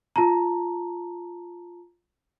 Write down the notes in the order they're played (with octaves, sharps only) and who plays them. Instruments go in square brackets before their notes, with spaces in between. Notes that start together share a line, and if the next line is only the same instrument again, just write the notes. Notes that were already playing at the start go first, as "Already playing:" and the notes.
[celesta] F4 A5 A#5